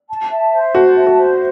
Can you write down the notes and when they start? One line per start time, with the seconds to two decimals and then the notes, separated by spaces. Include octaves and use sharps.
0.09 A5
0.30 E5
0.52 C5
0.75 F#4 A5
0.96 E5
1.07 F#4
1.18 C5